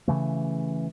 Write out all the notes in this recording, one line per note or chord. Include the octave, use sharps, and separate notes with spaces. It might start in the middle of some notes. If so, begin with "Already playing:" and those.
C#3 E3 A3